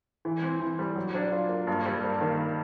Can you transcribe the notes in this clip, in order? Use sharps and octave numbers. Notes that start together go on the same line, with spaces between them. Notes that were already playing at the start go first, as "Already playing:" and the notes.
E3
C4
E3
G3
F#3
D4
F4
A#3
G2
G3
A#3
D#3